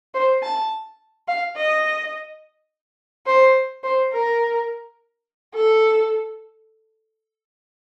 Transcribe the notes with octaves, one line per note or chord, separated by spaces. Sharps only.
C5
A5
F5
D#5
C5
C5
A#4
A4